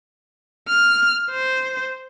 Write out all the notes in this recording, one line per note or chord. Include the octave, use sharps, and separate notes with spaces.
F6
C5